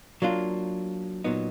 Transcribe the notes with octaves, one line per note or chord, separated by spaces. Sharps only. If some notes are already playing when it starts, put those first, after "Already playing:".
F#3 A#3 D4 F4
A#2 F#3 B3 D#4